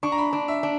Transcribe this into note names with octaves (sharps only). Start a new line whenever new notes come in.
D4 C#6
A#5
B5
D4
E5
D4